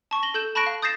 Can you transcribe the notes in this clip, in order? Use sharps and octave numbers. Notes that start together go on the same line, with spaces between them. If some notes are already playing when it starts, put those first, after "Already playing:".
A5 C#6
A#6 F#7 G7
A4 G6 E7
A5 B5 C#6 F#6 A#6 D7
F5
D#6 G6 A6 A#6 C7 E7